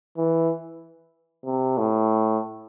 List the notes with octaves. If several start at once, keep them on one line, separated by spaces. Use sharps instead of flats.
E3
C3
A2